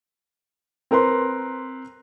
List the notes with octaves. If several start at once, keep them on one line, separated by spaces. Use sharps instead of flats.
C4 A#4 B4 C6